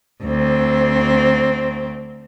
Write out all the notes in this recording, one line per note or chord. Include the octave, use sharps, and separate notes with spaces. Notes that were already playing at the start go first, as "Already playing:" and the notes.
D2 C4